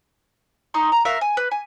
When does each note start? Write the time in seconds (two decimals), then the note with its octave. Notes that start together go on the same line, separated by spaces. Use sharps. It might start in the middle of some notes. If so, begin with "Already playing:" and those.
0.74 D#4 C6 C#6
0.92 A#5
1.05 F#4 A#4 E5 F5
1.21 G#5
1.37 B4
1.51 G#5